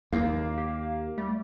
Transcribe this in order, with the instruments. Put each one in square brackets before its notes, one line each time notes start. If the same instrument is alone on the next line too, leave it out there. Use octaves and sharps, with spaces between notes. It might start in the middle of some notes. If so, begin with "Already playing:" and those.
[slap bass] D#2 [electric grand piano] A#3 [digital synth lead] F5
[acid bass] G4
[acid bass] G3 [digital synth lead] A3